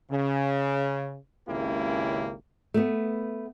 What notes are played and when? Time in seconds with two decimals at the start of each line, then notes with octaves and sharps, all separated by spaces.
0.11 C#3
1.48 G#1 C#2 C#3 A#3 E4 G4
2.74 A3 B3